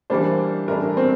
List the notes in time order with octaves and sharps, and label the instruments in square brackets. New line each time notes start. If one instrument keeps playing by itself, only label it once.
[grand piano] E3 G3 A#3 D4 [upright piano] C5
[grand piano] A2 E3 G3 D4 [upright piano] A#4
[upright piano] C4